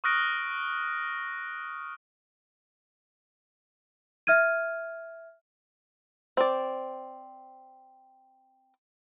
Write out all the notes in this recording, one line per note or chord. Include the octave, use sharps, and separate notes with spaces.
C#6 D#6 F6 F#6 A#6 D7
E5 F6 G#6 D#7
C4 D5